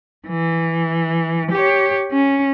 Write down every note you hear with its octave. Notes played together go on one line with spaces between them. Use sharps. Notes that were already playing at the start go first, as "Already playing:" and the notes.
E3
G4 C#5
C#4